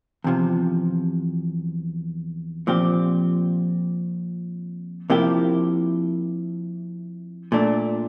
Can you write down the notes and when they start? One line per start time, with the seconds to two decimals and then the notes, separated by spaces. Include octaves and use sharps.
0.24 E2 C3 F3
2.67 A#2 F3 C4 G4
5.10 C3 F3 A#3 E4 G4
7.52 A#2 A3 D4